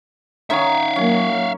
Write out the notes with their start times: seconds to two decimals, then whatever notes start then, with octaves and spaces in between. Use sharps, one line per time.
0.50 D#3 C#4 C#5 E5 F5
0.96 F#3 A#3 C#4